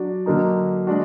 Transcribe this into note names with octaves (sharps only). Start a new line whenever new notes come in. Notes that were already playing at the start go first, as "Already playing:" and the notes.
Already playing: F#3 D4 F#4
D3 F#3 A#3 D#4
G#3 D4 F#4